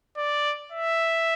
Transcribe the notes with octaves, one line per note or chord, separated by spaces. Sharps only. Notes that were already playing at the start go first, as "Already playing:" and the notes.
D5
E5